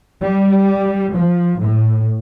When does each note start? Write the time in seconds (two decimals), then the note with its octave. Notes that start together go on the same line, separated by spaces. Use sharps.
0.21 G3
1.13 F3
1.60 A2